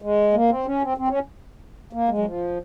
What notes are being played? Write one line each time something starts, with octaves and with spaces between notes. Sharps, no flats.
G#3
A#3
C4
C#4
C4
C4
C#4
A#3
G#3
F#3
F3